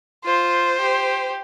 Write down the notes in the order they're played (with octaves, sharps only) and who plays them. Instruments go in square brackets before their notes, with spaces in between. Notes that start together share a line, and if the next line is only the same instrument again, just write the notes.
[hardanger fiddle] F4 [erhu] C5
[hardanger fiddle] G4